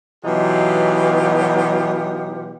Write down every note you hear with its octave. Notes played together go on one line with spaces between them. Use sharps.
B2 E3 F#3 D#4 F4 G4